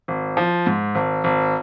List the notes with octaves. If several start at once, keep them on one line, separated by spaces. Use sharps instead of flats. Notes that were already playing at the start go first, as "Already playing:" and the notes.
G#1
F3
G#2
G#1
G#1